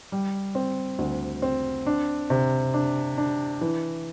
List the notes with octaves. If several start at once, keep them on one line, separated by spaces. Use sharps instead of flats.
G3
C4
D2
C4
D4
C3
D4
D4
E3